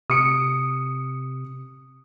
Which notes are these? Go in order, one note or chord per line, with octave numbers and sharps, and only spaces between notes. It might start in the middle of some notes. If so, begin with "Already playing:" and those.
C3 D#6 C#7 D7